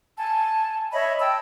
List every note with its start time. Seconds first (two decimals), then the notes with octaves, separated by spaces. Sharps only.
0.17 G#5 A5
0.93 C#5 D#5 E5 B5
1.20 G5 A5 E6